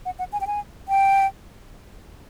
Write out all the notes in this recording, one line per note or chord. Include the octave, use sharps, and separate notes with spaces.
F#5
F#5
G#5
G5
G#5
G5